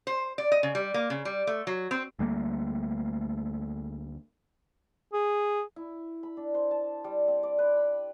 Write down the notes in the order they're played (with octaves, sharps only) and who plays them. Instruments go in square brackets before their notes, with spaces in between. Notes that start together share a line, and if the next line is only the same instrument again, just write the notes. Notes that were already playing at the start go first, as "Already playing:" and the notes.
[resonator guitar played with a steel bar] C5
D5
D#5
C#3
G3
A#3
C#3
G3
A3
F#3
C4
[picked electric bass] D2 G3 A3 A#3
[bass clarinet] G#4
[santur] E4
B5
D4
C5
A5
G3
C4
D5
B4
B5